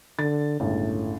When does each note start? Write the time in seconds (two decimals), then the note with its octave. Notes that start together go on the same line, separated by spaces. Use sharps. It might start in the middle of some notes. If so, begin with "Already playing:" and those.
0.19 D3 A6
0.60 G1 C#2 A2